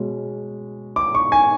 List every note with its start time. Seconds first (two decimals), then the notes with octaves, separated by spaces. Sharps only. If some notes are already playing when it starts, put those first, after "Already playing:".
Already playing: B2 G#3 C#4
0.96 D6
1.15 C#6
1.32 G#5